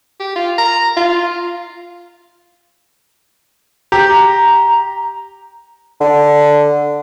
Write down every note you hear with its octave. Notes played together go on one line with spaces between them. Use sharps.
G4
F4
A#5
F4
G4 A#5
D3